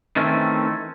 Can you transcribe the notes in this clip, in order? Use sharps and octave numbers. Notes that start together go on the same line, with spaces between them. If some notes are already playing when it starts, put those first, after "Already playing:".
D#3 E3 A3 C4 C#4